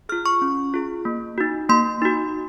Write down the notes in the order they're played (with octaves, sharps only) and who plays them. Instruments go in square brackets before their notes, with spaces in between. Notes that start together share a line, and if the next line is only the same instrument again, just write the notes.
[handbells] F4 G#4 F6
C#6
C#4
F4 G#4
A#3
D#4 F#4
A#3 C6
D#4 F#4